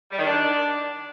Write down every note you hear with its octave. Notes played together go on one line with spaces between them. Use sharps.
G3
D#3
D4